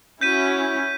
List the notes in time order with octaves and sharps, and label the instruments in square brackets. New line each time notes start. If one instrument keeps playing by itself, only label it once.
[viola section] C#4 E4 F#4 [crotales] G6 B6 D#7